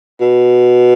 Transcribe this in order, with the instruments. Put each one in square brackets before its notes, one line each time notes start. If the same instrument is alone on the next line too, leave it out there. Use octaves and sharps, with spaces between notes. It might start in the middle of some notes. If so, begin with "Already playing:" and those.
[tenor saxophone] B2